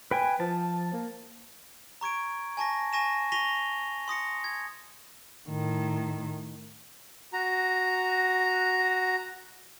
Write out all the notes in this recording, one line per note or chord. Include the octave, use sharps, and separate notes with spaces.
B4 G5 G#5
F3 A5
A#3
A#5 C#6 G#6 D7
G#5 A5 C#6 A#6
G#5 C#6 A#6 D#7 E7
C#6 A#6 B6 D#7 F7 G7
C6 D#6 A#6 C#7
G#6
A2 D#3
F#4 A#5